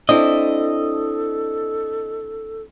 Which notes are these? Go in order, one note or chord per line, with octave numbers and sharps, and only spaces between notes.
C4 D4 E4 A4 D#5